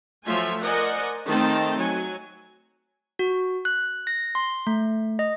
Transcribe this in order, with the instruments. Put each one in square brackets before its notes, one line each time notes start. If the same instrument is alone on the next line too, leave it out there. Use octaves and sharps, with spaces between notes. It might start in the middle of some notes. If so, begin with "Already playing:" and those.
[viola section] F3 F#3 A3 F4 E5 G#5
A#4 C5 D5 D#5 F#5 G#5
D#3 A3 C4 D#4 A5
F#3 G#5
[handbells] F#4
F#6
A#6
C6
A3
D#5